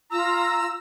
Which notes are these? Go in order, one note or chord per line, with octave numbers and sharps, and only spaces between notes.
F4 A#5 E6